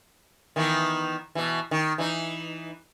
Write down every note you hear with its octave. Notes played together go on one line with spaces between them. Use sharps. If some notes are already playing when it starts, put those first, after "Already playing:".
D#3 E3 B3
B2 E3
D#3
E3 D#4